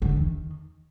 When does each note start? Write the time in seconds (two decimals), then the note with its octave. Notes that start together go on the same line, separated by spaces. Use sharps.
0.02 D3
0.09 E2
0.16 D#3